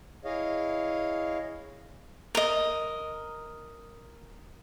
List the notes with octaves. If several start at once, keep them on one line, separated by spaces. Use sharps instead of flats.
E4 G#4 C#5 D#5 F5
A#4 D#5